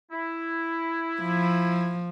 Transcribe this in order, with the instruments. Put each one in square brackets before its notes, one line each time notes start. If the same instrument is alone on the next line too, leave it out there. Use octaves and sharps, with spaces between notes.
[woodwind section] E4
[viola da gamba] F3